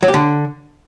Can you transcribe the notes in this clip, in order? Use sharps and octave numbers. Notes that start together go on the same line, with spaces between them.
F#3
G4
D3